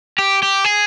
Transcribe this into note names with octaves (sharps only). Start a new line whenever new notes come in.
G4
G4
G#4